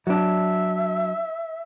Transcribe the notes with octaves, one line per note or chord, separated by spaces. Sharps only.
F#3 D4 E5